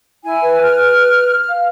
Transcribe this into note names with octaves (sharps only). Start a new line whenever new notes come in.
E4 G#5
B4
F6
F5